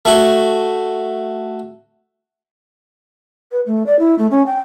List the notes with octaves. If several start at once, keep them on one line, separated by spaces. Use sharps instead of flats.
A3 F#4
B4
A3
D5
E4
A3
C#4
G5